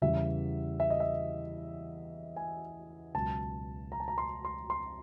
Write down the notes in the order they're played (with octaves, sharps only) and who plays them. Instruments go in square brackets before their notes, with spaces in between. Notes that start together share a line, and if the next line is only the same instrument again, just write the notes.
[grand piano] E2 C#3 E3 G3 E5
E5
D#5
E5
G#5
C#2 B2 F#3 A5
A#5
A5
A#5
C6
C6
C6